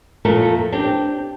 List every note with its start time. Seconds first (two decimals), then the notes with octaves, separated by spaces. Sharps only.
0.25 F2 A#2 A3 A4 A#4
0.72 C4 D4 G4